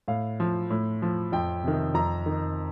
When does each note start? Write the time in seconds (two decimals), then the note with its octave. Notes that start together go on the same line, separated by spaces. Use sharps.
0.08 A2 F5
0.40 F3
0.70 A2
1.02 F3
1.32 F2 G5
1.63 C3 D#3
1.94 F2 A#5
2.26 D#3